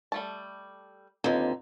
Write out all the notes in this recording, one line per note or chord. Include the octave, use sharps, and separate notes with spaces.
G3 A3 A5
D#2 D3 C4 D#4 F4 B4